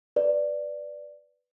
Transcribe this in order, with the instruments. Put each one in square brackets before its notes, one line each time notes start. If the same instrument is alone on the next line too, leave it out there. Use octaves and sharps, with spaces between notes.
[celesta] B4 D5